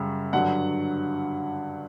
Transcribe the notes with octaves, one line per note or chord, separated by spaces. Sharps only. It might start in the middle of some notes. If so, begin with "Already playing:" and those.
Already playing: F#2 C#3 G3
G2 D3 F#3 F#5